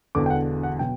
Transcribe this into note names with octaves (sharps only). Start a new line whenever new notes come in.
E1 E2 D3 D6
G5
F#5
F#5
B2 F#3 G5